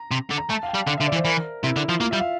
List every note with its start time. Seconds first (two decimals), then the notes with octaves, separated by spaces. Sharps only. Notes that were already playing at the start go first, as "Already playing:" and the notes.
Already playing: A#5
0.11 C3
0.31 D3
0.38 A#5
0.50 A3 A5
0.63 F5
0.68 G5
0.74 G3
0.87 D3 F5
0.98 D3 E5
1.07 D5
1.12 E3
1.16 C5
1.25 E3 A#4
1.64 C3 E4
1.76 D3
1.89 F3
2.00 A#3 F4
2.11 G3 E5
2.20 F5